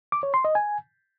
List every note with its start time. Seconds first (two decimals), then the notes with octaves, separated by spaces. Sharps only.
0.12 D6
0.23 C#5
0.34 C6
0.45 D#5
0.55 G#5